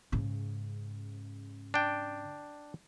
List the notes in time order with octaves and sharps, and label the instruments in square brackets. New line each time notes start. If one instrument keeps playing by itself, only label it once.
[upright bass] G#2 C#3
[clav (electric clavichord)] D4 G5